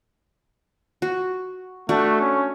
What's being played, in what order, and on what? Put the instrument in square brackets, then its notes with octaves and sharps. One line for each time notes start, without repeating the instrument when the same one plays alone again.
[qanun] F#4
[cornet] A3 [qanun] D4 F#4
[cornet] C#4